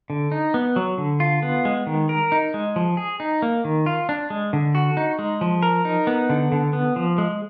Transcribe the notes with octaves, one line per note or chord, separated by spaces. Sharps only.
D3
D#4
B3
F#3
D3
F4
B3
G#3
D#3
A#4
D#4
G#3
F3
G#4
D#4
A#3
D#3
F4
D4
G#3
D3
F#4
D#4
G#3
F3
A#4
D#4
B3
D3
D3
B3
F3
G#3